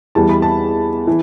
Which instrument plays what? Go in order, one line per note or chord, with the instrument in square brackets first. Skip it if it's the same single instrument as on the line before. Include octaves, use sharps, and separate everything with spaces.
[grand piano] E2 E3 G3 A5
B5
A5
E3